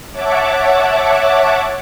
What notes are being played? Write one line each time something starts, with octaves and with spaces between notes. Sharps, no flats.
C#5 E5 F#5 A5 D6